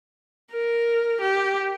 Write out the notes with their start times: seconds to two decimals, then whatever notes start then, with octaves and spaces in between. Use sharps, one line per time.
0.53 A#4
1.21 G4